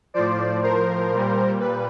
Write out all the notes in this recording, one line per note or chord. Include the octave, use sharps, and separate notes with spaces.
A2 F3 C5 D5
A#4 C5
A#2 G3
B4